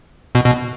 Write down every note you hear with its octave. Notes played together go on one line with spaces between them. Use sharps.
B2
B2